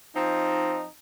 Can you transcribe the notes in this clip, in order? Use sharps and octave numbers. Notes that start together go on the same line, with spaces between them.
F3 C4 D#4